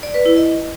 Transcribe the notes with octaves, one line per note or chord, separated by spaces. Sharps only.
D5
B4
E4
D#5